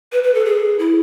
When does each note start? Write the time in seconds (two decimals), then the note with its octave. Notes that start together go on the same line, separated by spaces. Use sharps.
0.12 B4
0.24 B4
0.34 A4
0.45 G#4
0.79 E4